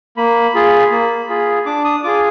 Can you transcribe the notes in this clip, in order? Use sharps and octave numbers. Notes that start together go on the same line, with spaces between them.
A#3 B5
F4 G#4
A#3
F4 G#4
D4 D6
D#6
F4 G#4 D6